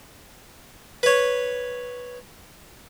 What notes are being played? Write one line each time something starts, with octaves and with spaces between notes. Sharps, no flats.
B4 C#5